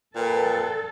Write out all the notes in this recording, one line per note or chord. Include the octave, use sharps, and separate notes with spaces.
A#2 A4 B4 G5